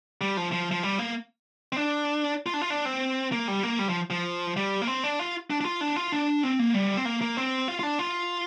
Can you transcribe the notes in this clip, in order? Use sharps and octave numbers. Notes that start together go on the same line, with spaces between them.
G3
F3
F3
F3
G3
A#3
C4
D4
F4
D4
F4
D4
C4
A#3
G3
A#3
G3
F3
F3
G3
A#3
C4
D4
F4
D4
D4
F4
D4
F4
D4
C4
A#3
G3
C4
A#3
A#3
C4
F4
F4
D4
F4